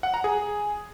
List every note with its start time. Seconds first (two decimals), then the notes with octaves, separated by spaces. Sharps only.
0.03 F#5
0.14 A#5
0.24 G#4